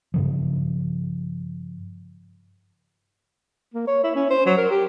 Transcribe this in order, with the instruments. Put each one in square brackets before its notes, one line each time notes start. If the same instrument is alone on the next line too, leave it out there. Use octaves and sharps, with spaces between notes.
[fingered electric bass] G2 C#3 F3
[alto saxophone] A#3
C#5
E4
C#4
C5
F#3
A#4
G4